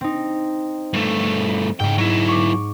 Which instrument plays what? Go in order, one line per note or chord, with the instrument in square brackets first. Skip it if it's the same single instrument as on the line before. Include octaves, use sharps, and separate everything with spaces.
[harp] C4 D#4
[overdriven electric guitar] G2 A3
[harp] G#2 [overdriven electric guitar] C#3 G5
[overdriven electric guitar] F#3 E4
[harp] C#6 D6